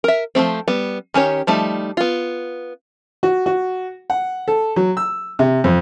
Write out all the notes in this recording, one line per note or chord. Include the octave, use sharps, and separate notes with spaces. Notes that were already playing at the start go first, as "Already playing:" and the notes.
A#4 E5
F3 F#3 A3 C4
G3 B3
D#3 C#4 G4 C#5
F3 G3 A3 D#4
B3 F4
F#4
F#4
F#5
A4
F#3
E6
C3
F2